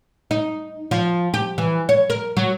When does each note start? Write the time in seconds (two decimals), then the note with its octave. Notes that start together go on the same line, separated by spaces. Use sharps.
0.31 D#4
0.91 F3
1.34 G4
1.58 E3
1.89 C#5
2.10 A#4
2.37 F#3